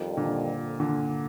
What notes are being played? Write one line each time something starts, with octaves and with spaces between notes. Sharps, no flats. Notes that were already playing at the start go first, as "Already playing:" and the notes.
Already playing: F2 D#3 G3
A#2 D3
A#2 D3